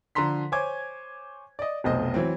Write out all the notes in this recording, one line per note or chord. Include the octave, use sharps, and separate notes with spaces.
D3 F3 A#5 C6 B6
C5 C#5 G#5 D6 G#6
D5 D#5
F1 B1 C5 D#5
E3 F#3 C4